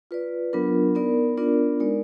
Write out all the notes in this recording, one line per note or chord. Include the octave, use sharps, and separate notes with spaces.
F4 B4 D5
F#3 B3 D4 F4 A#4
B3 D#4 A#4 D5
B3 D4 F4 A#4 D5
G#3 D#4 A#4 D5